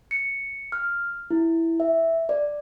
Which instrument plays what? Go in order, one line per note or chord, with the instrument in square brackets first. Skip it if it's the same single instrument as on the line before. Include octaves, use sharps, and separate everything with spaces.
[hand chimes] C#7
F6
E4
E5
D5